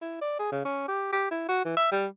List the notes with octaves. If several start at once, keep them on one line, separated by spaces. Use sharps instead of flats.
E4
D5
G#4
C#3
C#4
G4
G4
E4
F#4
E3
E5
G3